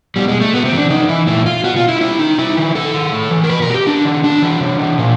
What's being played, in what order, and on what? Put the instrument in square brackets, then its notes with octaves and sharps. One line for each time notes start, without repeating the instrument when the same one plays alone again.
[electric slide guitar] B2 G3
G#3
A3
C3 B3
C4
E3
D4
C3 D#4
E3 E4
A#2 E4
F4
B2 F#4
F4
E4
D#4
C3 E4
D#3 D#4
C3 E4
D#3
C3 A4
D#3
A2
E3
A#4
B2 B4
A#4
F#4
G4
C3 D4
D#3
A2 D4
E3
C3
E3
A#2